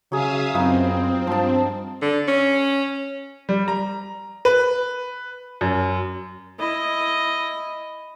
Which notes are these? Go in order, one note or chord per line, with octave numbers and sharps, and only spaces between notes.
C#3 F#3 G#4 E5 F5 D#6
F#2 B3 C4 D#4 F4
G2 F3 A5
D3
C#4
G3
A#5
B4
F#2
E4 D#5